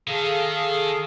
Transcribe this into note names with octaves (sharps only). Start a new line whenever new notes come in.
D#3 G#4 A4 F5